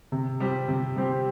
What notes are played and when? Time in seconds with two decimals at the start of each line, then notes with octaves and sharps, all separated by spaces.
0.12 C3
0.40 G3 C4 G4
0.68 C3
0.96 G3 C4 G4